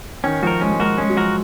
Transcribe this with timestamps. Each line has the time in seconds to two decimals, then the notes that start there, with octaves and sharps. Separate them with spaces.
0.24 D#3 C#4
0.43 F3 F#4 A#4
0.61 G#3 C#4
0.72 G#3
0.79 A#3 F#4 A#4
0.98 G#3 C#4
1.09 F#3
1.16 F3 F#4 A#4